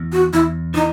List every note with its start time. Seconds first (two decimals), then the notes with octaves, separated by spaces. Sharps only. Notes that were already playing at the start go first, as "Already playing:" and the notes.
Already playing: E2
0.12 F#4
0.33 E2 E4
0.74 E3 D#4